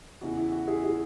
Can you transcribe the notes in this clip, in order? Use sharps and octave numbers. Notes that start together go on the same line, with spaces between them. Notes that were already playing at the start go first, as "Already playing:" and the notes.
E2 C#3 E3 F#4
E4
F#4
E4 G#4
E4 G#4